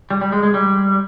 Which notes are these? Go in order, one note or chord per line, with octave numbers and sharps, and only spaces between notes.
G3
G3
G#3
G#3
G3